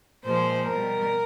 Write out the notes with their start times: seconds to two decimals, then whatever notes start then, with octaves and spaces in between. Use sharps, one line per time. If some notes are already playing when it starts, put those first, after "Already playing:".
0.24 A#2 F3 G#3 C5
0.67 B2 G3 A#4